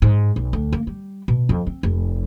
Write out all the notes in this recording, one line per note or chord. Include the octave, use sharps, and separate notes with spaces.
G#2
B1
D2
A#3
G3
B2
F2
C4
F1